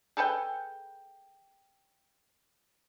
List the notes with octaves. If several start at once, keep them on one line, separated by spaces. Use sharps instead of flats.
G#4 A4 B4 G5